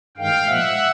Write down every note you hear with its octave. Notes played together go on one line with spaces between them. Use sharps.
G2 D#3 G#3 F5 G5
A#2 F3 G#3 E5 F#5